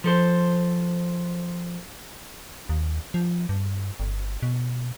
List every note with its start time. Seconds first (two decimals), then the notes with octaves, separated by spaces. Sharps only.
0.04 F3 A4 C5
2.69 D#2
3.14 F3
3.49 G2
4.00 G1
4.43 B2